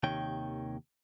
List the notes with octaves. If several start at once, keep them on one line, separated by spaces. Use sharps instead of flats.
D#2 C3 D#3 C#5 G5